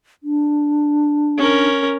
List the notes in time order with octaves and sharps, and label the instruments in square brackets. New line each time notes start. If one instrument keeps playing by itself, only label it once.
[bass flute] D4
[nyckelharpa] C#4 A#4